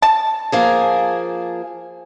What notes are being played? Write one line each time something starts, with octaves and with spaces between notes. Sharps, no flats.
A5
F3 A#3 G#4